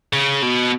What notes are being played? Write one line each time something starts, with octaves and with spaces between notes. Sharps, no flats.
C#3
B2